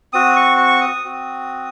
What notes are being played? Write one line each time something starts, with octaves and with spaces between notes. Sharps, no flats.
C4 F#4 D#6
C#6
C#6
D#6
C4 F#4